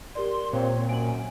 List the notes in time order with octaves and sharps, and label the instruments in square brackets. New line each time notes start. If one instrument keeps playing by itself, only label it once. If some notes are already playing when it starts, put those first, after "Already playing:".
[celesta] G4 A#4 D5 [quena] C6
[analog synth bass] A#2 [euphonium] C4 [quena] C#5
[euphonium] F#2 [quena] G#5 [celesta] D7 F#7